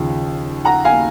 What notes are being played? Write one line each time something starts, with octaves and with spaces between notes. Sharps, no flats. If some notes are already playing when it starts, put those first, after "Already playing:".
Already playing: D#2 C#3 F3
F#5 A#5
F5 G#5